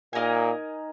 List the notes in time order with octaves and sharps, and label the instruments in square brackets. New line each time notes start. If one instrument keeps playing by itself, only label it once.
[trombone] A#2 [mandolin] D#4 A#4 D#5 G#5